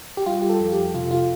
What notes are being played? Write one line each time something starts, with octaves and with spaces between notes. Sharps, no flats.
G4
G3 F4
G4
A4
F2
G4
C3 F4
F4